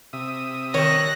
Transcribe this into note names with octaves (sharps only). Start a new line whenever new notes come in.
C3 E5 D#6
D#3 G3 C#5 F#6 A#6